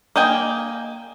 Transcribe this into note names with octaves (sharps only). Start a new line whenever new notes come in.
A#3 D#5 G5 G#5